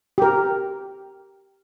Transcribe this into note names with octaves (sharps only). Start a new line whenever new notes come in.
G4 A#4